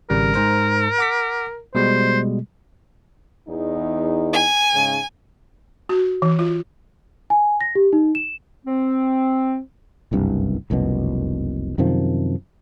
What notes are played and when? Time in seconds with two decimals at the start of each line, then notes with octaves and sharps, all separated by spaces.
0.10 G#1 C#3 G3 A#4
0.34 G#2 C5 A#5
0.98 F#5 D6 B6
1.75 B2 G3 G#3 C5
3.49 E2 D#4
4.33 G#5
4.74 G#2 C#3
5.89 F#4
6.22 E3
6.39 F4
7.30 G#5
7.61 A#6
7.75 G4
7.93 D#4
8.15 E7
8.66 C4
10.12 F#1 C2 G2
10.70 F1 C2 F#2 B2
11.78 F#2 C3 D#3 F3